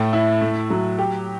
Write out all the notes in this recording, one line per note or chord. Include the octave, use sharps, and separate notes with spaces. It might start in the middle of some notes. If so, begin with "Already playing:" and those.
Already playing: A2 A3
E4
A3
F#3
G4